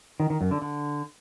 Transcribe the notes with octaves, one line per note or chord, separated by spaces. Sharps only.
D#3
D#3
F#2
D3
D3